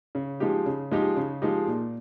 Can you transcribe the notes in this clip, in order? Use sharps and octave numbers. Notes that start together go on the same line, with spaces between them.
C#3
F3 G#3 D#4 G4
C#3
F3 G#3 D#4 G4
C#3
F3 G#3 D#4 G4
A#2